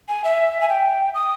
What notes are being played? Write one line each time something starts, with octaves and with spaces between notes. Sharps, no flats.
G#5
E5
G#5
G5
D#6